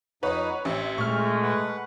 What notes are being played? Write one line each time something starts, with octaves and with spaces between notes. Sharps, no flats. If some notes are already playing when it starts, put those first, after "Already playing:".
F2 D#4 B4 C#5 F#5
A1 C4 E5
A#2 G#3 A3 C#6 F6
B4 F#5